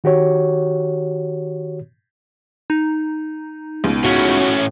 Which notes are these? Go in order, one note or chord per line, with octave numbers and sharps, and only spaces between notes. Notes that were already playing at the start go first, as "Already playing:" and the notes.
D#3 F#4 G4 C#5
D#4
C#2 B2
A2 C#4 F#4